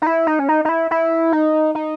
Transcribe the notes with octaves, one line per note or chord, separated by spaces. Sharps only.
D#4
E4
D#4
C#4
D#4
D#4
E4
E4
D#4
D#4